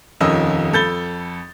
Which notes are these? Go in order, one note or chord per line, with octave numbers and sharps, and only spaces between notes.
D#1 F2 D#3 C#4 D#5 E6
F2 A4 B5 G6 A6 G7